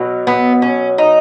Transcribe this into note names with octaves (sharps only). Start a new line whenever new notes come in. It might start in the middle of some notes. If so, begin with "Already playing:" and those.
Already playing: B2 F#3
B3
C#4
D#4